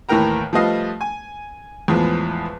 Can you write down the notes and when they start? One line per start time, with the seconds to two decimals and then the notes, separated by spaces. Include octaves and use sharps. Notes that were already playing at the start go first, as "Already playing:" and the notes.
0.09 D#2 A2 E3 A#4 G5 A#5
0.53 F3 G3 A3 B4 D#5 F5
1.01 G#5
1.88 E2 A2 F3 G#3 B3